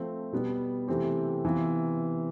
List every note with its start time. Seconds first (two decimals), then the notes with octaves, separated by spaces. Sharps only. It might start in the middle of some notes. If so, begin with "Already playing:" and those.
Already playing: F3 A3 C4
0.32 B2 G3 B3
0.88 C3 E3 A3 C4 G4
1.45 C3 E3 B3 F4